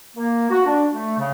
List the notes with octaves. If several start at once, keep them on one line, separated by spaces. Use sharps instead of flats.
A#3
F#4
D4
A3
C#3